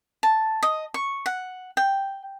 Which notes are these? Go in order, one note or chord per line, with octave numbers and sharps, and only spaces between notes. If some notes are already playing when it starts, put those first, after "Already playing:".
A5
D#5
C#6
F#5
G5